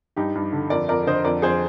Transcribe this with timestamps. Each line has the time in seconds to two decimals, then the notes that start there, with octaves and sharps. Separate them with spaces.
0.16 G2 D#4 G4
0.35 G2
0.53 D3
0.70 F2 A#4 D5
0.89 F2 A#4 D5
1.07 D3 C5 D#5
1.24 F2 A#4 D5
1.42 F2 G#4 C5